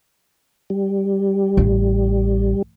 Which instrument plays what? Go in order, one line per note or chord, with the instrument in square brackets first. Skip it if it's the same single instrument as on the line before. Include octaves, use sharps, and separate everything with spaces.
[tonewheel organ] G3
[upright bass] A1